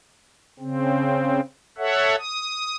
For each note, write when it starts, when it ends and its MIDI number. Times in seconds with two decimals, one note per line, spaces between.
0.59 1.40 49
0.59 1.40 60
1.78 2.16 69
1.78 2.16 73
1.78 2.16 76
1.78 2.16 78
2.18 2.76 87